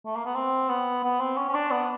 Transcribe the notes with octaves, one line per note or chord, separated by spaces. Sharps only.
A3
A#3
B3
C4
B3
B3
C4
C#4
C#4
D4
B3